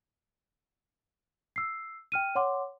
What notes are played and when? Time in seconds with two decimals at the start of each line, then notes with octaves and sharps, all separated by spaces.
1.56 E6 C7
2.12 G5 F6 D#7
2.35 C#5 F#5 C6 D6